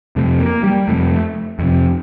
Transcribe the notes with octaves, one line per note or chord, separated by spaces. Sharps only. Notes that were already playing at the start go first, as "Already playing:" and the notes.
F2 C3 A3
A#3
G3
F2 C3 A3
F2 C3